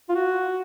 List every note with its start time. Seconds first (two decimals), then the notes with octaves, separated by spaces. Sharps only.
0.09 F4
0.15 F#4